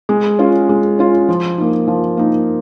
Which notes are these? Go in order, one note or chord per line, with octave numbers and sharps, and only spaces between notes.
G#3
C#4 F4
G#3
C#4 F4
F3
A#3 D#4
F3
A#3 D#4